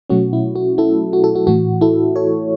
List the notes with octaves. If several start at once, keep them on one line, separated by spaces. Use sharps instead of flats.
B2 F#3 A3 C#4 F#4
E4
F#4
E4 A4
F#4
A4
F#4
A2 E3 A3 F#4
E4 A4
A4 C#5